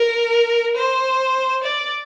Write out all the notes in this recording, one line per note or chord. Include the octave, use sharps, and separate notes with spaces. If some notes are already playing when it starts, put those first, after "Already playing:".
Already playing: A#4
C5
D5